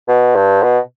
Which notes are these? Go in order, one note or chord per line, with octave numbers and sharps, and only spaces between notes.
B2
G2
B2